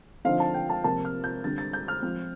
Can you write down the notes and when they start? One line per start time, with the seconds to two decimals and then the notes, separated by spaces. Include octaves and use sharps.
0.25 D3 F3 C4 D#4 F5
0.40 A5
0.54 G5
0.70 A5
0.84 C3 F3 A#3 A5
1.05 F6
1.24 G6
1.44 D3 G3 C4 A6
1.58 A6
1.73 G6
1.88 F6
2.03 F3 C4 F4